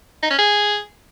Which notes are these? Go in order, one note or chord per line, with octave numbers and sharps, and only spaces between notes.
D#4
C#4
G#4